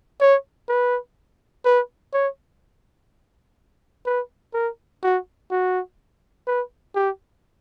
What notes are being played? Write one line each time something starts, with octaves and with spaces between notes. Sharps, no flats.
C#5
B4
B4
C#5
B4
A#4
F#4
F#4
B4
G4